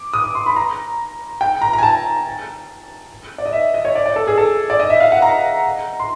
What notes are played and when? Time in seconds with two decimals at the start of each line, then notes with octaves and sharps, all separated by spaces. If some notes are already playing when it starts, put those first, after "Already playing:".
Already playing: D6
0.13 D#6
0.24 D6
0.35 C6
0.46 B5
0.56 A#5
1.41 G5
1.62 A#5
1.73 A#5
1.78 G#5
1.83 A5
3.38 D5
3.46 D#5
3.53 E5
3.74 D#5
3.85 C#5
3.95 D5
4.06 D5
4.16 A4
4.27 G#4
4.38 A4
4.70 D5
4.80 D#5
4.90 E5
5.00 F5
5.12 F#5
5.22 A#5
6.00 C6